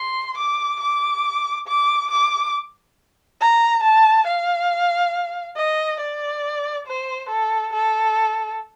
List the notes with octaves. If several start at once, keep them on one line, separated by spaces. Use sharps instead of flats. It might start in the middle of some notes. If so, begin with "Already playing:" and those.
Already playing: C6
D6
D6
D6
D6
A#5
A5
F5
D#5
D5
C5
A4
A4